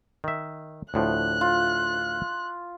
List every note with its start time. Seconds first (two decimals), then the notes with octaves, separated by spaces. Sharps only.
0.24 D#3 E5
0.94 D2 A2 F3 F#6
1.41 F4